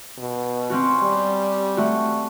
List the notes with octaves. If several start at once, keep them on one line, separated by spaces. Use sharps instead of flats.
B2
C4 C#4 F#4
G3
A3 F#4